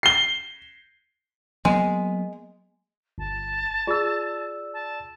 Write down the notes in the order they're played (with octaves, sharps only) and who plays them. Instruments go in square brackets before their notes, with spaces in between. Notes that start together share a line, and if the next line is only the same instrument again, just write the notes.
[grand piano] C7 G7
[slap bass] F#3 A#3 B3 [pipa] G#3
[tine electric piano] G1 [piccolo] A5
[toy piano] F4 G#4 [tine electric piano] D5 E6
[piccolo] A5